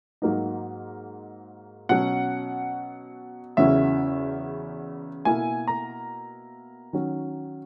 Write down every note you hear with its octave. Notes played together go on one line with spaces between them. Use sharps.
G#2 F#3 A#3 D#4
B2 F#3 C#4 F#5
E2 C#3 F#3 C#4 E4 E5
B2 A#3 E4 G#5
A#5
D#3 F#3 C#4